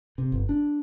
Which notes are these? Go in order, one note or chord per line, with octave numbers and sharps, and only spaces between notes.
C3
G1
D4